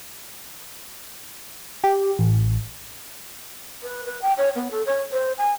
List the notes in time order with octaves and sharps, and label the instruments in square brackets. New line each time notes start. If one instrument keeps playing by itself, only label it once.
[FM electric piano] G4
A1
[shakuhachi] B4
B4
G5
C#5
B3
A4
C#5
C5
G#5